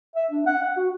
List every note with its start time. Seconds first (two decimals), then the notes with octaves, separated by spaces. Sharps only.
0.16 E5
0.31 D4
0.46 F#5
0.63 F#5
0.77 F#4